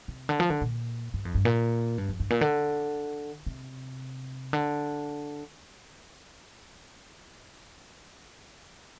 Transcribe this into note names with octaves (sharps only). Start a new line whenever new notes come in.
C3
D3
F3
D3
A#2
G2
F2
G2
A#2
G2
F2
G2
A#2
D3
C3
D3